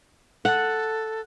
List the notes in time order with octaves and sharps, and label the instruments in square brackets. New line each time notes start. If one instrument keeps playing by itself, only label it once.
[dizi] A4 [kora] F#5